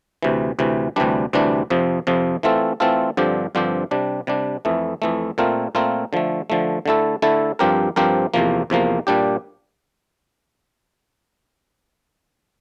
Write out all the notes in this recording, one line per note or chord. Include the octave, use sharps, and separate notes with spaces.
D2 C3 E3
D2 C3 E3
D2 C3 E3 G3 D4
D2 C3 E3 G3 D4
F2 C3 F3
F2 C3 F3
E3 A3 C4 F4 A4
E3 A3 C4 F4 A4
G2 D3 F3 C4 G4
G2 D3 F3 C4 G4
C3 G3 D4
C3 G3 D4
F2 E3 A3
F2 E3 A3
A#2 A3 C4 F4 A#4
A#2 A3 C4 F4 A#4
D3 F3 A3
D3 F3 A3
D3 A3 E4 A4
D3 A3 E4 A4
G2 F3 C4 G4 A#4
G2 F3 C4 G4 A#4
E2 C3 F3 A#3
E2 C3 F3 A#3
A#2 G3 D4 G4